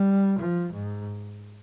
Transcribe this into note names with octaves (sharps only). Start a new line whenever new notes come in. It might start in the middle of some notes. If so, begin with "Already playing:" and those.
Already playing: G3
F3
G#2